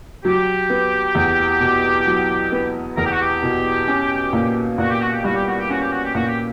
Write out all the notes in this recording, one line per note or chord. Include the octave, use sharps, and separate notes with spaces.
F#3 G4
B3
E2
B2
F#3
B3
E2 A#4
G4
F#4
G4
B2
C#4
A#2
A#2 F#4
G4
F#4
G4
G3 F#4
G4
F#4
G4
C#4 F#4
G4
F#4
G4
A#2 F#4
G4